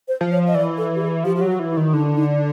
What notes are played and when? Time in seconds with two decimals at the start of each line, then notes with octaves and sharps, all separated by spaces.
0.08 C5
0.21 F3
0.32 C#5
0.48 D#5
0.55 E3 D5
0.78 A4
0.96 G4
1.01 G#4
1.24 F3 G4
1.36 G4
1.41 F#3
1.47 F#4
1.59 E3
1.71 E4
1.77 D#3
1.93 D3 D#4
2.16 D#4